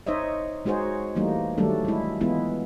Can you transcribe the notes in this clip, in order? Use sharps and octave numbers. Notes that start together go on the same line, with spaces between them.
D#4 C5 C#5 D#5 E5
G#3 D#4 F#4 G#4 C5 C#5
E3 G3 A3 A#3 D#4
D#3 F#3 G3 A3 D4 A4
G#3 E4
E3 G#3 B3 E4 F4